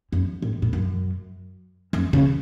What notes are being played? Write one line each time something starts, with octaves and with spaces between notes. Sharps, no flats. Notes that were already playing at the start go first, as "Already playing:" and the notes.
F#2
A2
A2
F#2
F#2
C#3